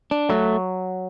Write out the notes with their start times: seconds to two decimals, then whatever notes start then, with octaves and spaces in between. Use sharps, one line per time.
0.11 D4
0.29 F#3 A3